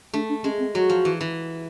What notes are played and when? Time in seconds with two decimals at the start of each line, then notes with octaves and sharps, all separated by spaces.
0.14 A3 D4
0.29 D4
0.44 G#3 C#4
0.59 C4
0.75 F#3 F#4
0.90 F3
1.05 E3
1.21 E3